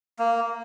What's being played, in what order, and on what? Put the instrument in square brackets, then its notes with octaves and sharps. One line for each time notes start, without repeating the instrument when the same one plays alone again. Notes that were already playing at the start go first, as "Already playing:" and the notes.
[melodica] A#3